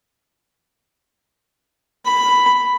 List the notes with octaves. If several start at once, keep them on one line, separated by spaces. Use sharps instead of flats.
B5